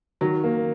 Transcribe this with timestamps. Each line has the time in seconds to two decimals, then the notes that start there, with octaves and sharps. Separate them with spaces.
0.21 D#3 F#3
0.44 A#3